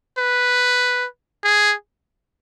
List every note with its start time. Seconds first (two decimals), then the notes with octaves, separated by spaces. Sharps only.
0.18 B4
1.44 G#4